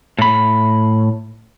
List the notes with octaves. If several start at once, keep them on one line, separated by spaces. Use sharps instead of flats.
A2 B5